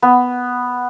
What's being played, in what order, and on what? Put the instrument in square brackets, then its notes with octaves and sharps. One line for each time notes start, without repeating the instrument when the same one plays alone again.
[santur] B3